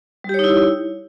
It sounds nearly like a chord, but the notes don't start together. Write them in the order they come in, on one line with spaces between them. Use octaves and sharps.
G3 G4 C#5 D#4 E4